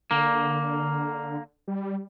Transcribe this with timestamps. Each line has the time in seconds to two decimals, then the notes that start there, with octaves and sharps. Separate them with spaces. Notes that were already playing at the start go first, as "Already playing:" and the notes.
0.11 D3 A#3
1.68 G3